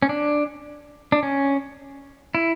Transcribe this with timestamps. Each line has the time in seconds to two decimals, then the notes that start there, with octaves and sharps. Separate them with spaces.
0.02 C#4
0.09 D4
1.12 D4
1.23 C#4
2.35 E4